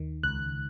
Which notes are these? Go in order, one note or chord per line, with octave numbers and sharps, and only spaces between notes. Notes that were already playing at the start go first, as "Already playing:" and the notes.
Already playing: D#2 D#3
C#2 F#6